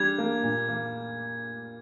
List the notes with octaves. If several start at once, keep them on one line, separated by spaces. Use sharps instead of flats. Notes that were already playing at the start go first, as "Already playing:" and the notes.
Already playing: G3 D4 G#6
A#3
A#2
A#3